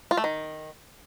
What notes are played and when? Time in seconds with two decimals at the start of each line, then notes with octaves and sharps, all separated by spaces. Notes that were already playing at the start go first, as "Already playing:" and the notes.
0.11 F4
0.17 A3
0.24 D#3